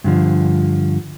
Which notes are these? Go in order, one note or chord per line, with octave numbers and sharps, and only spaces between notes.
G2 D3 F3